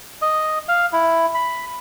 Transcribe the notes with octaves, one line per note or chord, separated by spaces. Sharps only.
D#5
F5
E4
B5